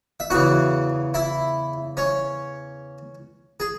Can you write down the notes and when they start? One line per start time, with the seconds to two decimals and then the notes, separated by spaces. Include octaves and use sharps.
0.20 E5
0.30 E2 C#3 E3 F#4 F#5
1.14 E4 E5
1.97 C#4 C#5
3.60 G#4